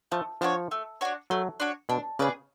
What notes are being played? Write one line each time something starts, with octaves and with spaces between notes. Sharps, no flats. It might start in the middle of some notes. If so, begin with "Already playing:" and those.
F3 A3
F3 D4 F#4 C#5
A3
D4 F#4 C#5
F#3 A3
D4 F#4 C#5
B2 D4
C#3 G#4 B4 D5